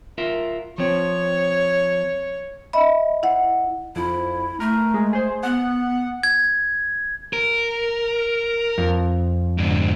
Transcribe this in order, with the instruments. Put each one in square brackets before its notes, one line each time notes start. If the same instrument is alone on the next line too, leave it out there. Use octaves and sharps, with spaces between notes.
[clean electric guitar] F4 A#4 E5
[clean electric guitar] F3 C4 [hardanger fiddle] C#5
[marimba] D#5 E5 B5
E4 F#5
[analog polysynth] F2 [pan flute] E4
[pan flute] A3 [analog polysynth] A#4
[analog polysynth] G#3
G#4 C5
[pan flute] B3 [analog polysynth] F#5
[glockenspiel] G#6
[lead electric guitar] A#4
[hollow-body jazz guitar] F2
[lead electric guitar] G#2 D3